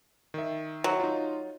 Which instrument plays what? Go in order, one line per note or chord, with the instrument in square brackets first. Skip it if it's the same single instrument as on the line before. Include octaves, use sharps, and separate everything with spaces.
[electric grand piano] D#3 E5
[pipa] F#3
[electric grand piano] D#4 F4